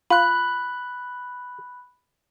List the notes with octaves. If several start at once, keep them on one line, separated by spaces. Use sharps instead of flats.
F4 B5 F#6